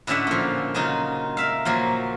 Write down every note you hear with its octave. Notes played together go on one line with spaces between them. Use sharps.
A2 D3 C#4 D5 E5 F#5
A#2 F3
C#3 F#3 D#4 F4
A#4 E5 F5
A#2 F3 F#3 A#3